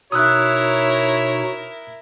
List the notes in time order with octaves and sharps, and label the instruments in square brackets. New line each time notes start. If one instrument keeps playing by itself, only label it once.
[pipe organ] B2 D#4 [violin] E4 A#4 [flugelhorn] C#5 [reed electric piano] D#6 E6 F#6